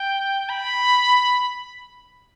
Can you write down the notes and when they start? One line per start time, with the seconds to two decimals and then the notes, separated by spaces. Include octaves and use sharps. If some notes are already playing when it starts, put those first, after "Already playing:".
Already playing: G5
0.49 B5